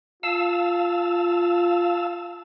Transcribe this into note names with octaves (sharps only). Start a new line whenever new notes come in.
F4 F5 A5 E6